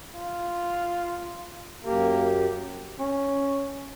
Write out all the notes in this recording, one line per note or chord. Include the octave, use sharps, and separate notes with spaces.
F4
F#2 A#3 G4
C#4